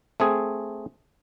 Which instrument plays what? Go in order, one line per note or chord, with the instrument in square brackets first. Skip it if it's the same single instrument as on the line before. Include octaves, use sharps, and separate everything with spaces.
[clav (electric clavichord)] A3 C4 G#4